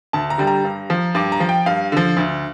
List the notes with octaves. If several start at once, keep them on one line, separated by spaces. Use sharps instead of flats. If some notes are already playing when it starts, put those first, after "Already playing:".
D2 A5
A#5
D3 G3
A#5
G2
F3
G2 D6
A#5
F3
G5
G2 F5
D3 F3
D2